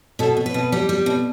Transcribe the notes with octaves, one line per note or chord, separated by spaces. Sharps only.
B2 A4
B2
B4
B2
G3
G3
B2